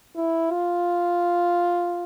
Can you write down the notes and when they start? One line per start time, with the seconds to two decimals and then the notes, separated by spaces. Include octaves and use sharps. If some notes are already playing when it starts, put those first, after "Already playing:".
0.16 E4
0.50 F4